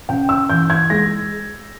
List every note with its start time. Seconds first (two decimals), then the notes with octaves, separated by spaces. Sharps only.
0.09 C#3 G5
0.29 E6
0.50 E3 G6
0.70 G#6
0.90 G#3 A#6